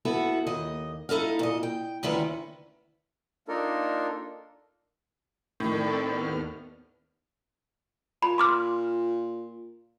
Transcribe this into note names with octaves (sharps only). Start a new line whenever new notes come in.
B3 E4 F#4 A4
D#2 D#5
D#4 E4 A4 D#5 F5
A#2 D#5
G5
D2 D#3 C#4 E4 B4
A#3 D4 D#4 F4 A4 A#4
A2 D#3 C4 A4 D5
D#2 B3 F6
A#2 B5
C6 D6 F6